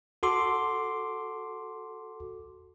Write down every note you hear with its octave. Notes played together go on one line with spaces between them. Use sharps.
F#4 A4 C6 D6